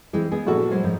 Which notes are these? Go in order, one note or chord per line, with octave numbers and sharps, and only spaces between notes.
E3 G#3 C4
G#3 B3 G#4
A#1 F#4 A4
F#3 G#3 C5
G#2 F3